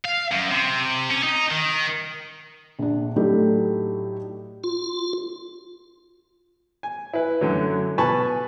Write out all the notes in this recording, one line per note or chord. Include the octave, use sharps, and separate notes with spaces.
F5
F#2
C3
C#4
D#4
D#3
A#1 D4
A2 F#3 A3 D4 D#4 G4
F4
G#5
E4 B4
F#2 D3 F#3
B2 B4 G#5 A5 B5 C#6